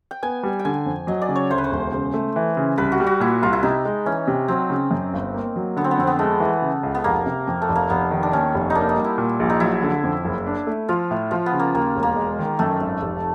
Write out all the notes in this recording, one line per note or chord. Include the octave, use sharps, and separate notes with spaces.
G5
B3 G#5
G3
G5
D3 G#5
F2
F#3 D#5
D5
C#3
C#5
D2 C5
B4
C5
E1
C#3
A3
E3
C#3
C2 B4
F#4
G3
F#4
A#2 E4
C2 F4
E4
C3 D#4
G#3
E3 C#4
C3
F#3 C4
C#3
F#2
G1
A#3
F#3
D3 B3
C4
B3
F2 C4
B3
G#3 A3
E3
C#3
C#2
B3
F1 A#3
C3
F2
A3
F1
A#3
F1 B3
D#3
D4
D#2 C#4
F1
D#4
A#3 D4
D#4
G3
E4
A#2
A#1
D#4
F#3 E4
D3
F2
F#1
D4
A3
F3 F4
A2
F3 F4
B3
C#3
A#3
D#2 A#3
E1
A#3
G#3
D#3
F#2 A3
G#1
F1